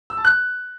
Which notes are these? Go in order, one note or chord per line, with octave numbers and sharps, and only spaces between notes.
E6
A5
F#6